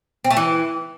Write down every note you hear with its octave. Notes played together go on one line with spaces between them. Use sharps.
C4
A3
E3